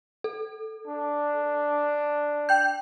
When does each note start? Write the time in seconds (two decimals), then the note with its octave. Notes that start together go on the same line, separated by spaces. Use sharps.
0.24 A4
0.87 D4
2.49 G5 G6